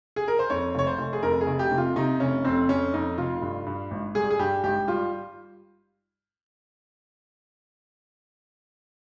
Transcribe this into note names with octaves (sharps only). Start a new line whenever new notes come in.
G#4
A#4
C5
F2 C#5
F1 C#5
C5
F1
G#4
F2 A#4
G#4
F1
G4
C3
F4
C3 D#4
F1 C#4
F2 C4
F2 C#4
F2 D#4
F1 F4
G2
G2
G#1
G3 G#4
G#4
G2 G4
G#1 G4
G3 F4